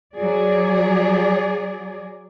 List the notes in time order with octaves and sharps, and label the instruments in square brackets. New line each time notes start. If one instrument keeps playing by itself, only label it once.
[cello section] F#3 G#4 D5